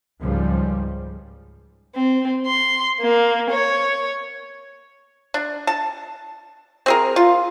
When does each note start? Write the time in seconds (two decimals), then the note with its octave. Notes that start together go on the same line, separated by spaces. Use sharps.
0.21 C#2 G#2 F3 G3
1.95 C4
2.47 C6
3.01 A#3
3.51 C#5
5.34 D4
5.67 A5
6.86 C4 G#4 A#4
7.16 F4